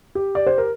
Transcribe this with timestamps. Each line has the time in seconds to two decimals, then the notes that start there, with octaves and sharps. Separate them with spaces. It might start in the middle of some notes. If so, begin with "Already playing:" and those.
0.15 G4
0.35 D5
0.47 C5
0.58 A#4